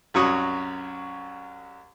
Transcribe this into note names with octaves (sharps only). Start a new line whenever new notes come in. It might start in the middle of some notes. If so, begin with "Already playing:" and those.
C2 F#2 F#3 C#6 D#6